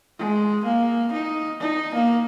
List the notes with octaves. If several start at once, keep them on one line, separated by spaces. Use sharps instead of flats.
G#3
A#3
D#4
D#4
A#3